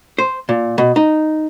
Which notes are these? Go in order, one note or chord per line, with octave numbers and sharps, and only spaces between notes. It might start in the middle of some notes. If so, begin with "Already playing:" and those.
C5
A#2
B2
D#4